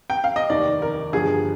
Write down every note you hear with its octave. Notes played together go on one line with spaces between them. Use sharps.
G5
F5
D#5
F1 D#2 D#3 D5
A#4
G1 G2 D3 F3 G#4